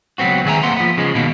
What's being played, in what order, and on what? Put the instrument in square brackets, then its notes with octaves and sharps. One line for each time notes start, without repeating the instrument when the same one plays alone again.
[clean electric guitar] C#2 F#3 B3 C4 F#4
D2 D#3 G#4 E5 G#5 A#5
A#3 B4 F#5 C6
F3 B3
C#3 F3 G#3
B2 D#3 A#3